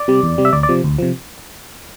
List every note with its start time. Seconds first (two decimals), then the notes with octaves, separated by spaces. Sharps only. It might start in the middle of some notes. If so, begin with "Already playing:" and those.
Already playing: D5
0.08 C3 G3
0.23 E2
0.38 C3 G3
0.45 E5
0.53 D2 D5
0.63 D5
0.69 C3 F3
0.84 D2
0.98 C3 F3